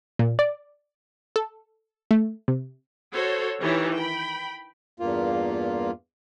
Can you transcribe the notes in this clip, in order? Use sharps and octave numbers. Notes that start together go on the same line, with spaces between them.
A#2
D5
A4
A3
C3
F#4 A4 C5 C#5
D#3 E3 G4 C#5
G5 B5
E2 G2 A#3 F4